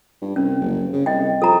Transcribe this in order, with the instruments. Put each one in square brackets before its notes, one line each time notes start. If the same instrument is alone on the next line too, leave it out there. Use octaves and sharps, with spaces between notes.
[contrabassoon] G2
[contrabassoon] C2 [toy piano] C#4
[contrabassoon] F#1
C#3
[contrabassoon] C2 [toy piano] D#5 G5
[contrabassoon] F3 [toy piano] A4 A#5